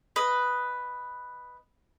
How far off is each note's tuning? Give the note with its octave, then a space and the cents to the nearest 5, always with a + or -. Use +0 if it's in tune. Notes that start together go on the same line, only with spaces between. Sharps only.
B4 +0 D#5 +0